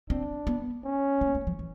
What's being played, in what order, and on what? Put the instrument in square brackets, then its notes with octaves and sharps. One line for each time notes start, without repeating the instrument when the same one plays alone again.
[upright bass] C4 [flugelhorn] D4
[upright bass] B3
[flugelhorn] C#4
[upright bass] A#3
A3
F3
E3